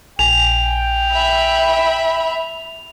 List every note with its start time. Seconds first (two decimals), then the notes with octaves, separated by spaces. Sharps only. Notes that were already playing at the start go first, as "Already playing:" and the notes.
0.19 A#1 G5 G#5 F7
1.11 E5 B5